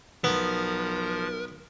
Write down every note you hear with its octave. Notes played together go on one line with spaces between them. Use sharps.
B1 F3 B3 A#4